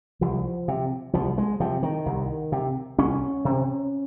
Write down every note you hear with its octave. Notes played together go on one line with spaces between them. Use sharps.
C2 F3
C3
C2 F3
G#3
C3 F3
D#3
C2
C3
C2 C#4
C3